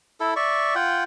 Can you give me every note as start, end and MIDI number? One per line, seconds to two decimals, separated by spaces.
0.20 0.34 64
0.20 0.34 69
0.36 0.75 74
0.36 0.75 76
0.36 0.75 85
0.75 1.04 65
0.75 1.04 78
0.75 1.04 79